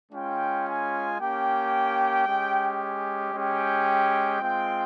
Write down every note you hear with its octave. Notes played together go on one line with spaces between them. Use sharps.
G#3 C#4 F4 G5
G#5
A#3 C#4 G4 G5
G#3 C#4 G4
G#3 C#4 G4 G5
G#3 C4 F4 G5